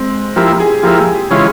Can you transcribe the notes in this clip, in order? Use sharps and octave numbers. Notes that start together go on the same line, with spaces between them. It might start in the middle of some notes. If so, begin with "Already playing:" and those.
Already playing: G#3 C4
F3 A#3 E4 G4
G#4
F3 A#3 E4 G4
C#3 E3 G#3 C#4 F4